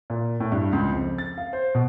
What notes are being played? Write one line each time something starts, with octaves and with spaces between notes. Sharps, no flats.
A#2
A2
G2
C#2
F2
A6
F5
C5
B2